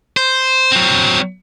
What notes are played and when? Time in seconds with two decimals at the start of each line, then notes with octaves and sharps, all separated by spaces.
0.17 C5
0.72 F#3 C4